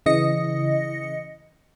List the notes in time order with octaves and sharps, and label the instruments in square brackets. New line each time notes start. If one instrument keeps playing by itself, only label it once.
[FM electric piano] C#3 E3 D#5 A#6 C#7